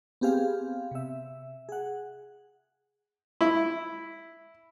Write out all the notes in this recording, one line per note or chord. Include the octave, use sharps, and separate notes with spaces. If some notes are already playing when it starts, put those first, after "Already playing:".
B3 C4 G4 G#4 F5
C3 E5
G#4 F#5
E4